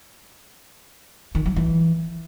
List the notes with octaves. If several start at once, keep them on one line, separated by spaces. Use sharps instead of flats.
D#3
F#3
E3